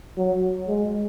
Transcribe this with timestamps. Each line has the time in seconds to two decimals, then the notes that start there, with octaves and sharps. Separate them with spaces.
0.18 F#3
0.68 G#3